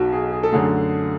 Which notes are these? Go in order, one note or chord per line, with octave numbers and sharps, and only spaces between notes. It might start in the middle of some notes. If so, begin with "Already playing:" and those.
Already playing: B1 B2 F#3 F#4
G#4
G#4
A4
F#2 D3 A3 G#4